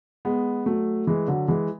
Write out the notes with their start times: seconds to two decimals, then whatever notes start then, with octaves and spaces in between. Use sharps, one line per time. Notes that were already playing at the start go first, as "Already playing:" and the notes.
0.25 G#3 B3
0.66 F#3 A3
1.07 E3 G#3
1.27 D3 F#3
1.48 E3 G#3